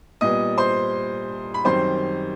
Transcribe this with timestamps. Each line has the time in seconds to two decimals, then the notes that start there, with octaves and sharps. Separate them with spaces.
0.21 A#2 G3 B3 D#5 D#6
0.58 C5 C6
1.54 B5
1.65 F#2 D#3 G3 C4 C5 C6